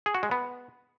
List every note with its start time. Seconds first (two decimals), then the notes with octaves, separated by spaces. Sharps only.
0.06 G#4
0.15 F#4
0.23 G#3
0.31 B3